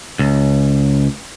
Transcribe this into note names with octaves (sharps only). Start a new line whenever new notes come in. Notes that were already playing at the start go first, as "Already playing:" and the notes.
C#2